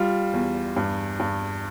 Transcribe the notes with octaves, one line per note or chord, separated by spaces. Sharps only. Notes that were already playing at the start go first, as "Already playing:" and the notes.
Already playing: G3 F4
E2
G2
G2